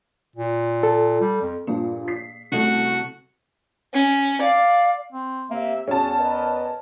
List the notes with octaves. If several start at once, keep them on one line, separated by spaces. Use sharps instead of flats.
A#2
A4
G3
F2
G2 A#2 F3 A#3 G#4
B6 C7
C2 A3 C#4 E4 F#4 A4
C#4
D5 F5
C4
C3 A#3 E5
E2 C#4 F#4 G#4 A5
A#4 B4 D#5